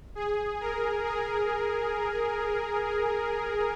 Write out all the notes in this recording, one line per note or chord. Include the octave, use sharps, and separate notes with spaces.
G#4
A#4
G#4